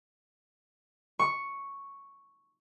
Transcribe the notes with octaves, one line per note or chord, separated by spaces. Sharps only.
C#6